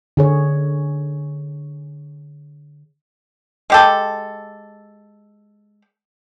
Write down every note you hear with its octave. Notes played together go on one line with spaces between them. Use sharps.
D3 G#4 C#5
G#3 G4 A4